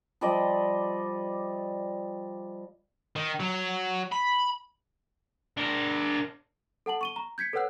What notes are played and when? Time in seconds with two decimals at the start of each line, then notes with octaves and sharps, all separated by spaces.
0.21 F3 G3 D5 D#5
3.16 D#3
3.40 F#3
4.12 B5
5.57 D4 A#4
6.86 A4 F#5 A5 F#7
7.01 C#6 D#7 G7
7.16 A#5
7.38 G6 G#6 B6 C#7
7.53 A4 B4 C#5 F#5 E6 F#6